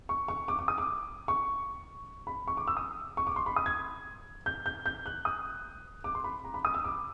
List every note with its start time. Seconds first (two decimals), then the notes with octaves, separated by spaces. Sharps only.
0.09 C#6
0.28 C#6
0.48 D6
0.59 D6
0.68 D#6
0.78 D6
1.28 C#6
2.27 B5
2.48 C#6
2.57 D6
2.67 E6
2.77 D#6
3.17 C#6
3.27 D6
3.36 C6
3.46 B5
3.56 D#6
3.66 G#6
4.46 G6
4.66 G6
4.86 G6
5.06 F#6
5.25 D#6
6.04 D6
6.15 C6
6.24 B5
6.44 A#5
6.54 B5
6.65 D#6
6.75 E6
6.84 D6